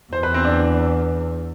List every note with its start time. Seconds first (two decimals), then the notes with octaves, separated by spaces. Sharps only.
0.13 E2 C5
0.23 B4
0.34 C4
0.45 D4